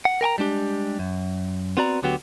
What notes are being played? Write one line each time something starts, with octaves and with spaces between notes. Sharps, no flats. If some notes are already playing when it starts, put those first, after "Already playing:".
F#5
A#4 G5 G#5 A#5
G3 G#3 D4 G4
F#2
B3 C4 F#4 D5 A#5
D2 D3 F#3 B3 F#4 G4